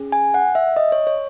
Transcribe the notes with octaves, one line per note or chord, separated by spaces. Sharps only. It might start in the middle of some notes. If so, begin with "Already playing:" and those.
Already playing: C#4 G#4
G#5
F#5
E5
D#5
C#5
C#5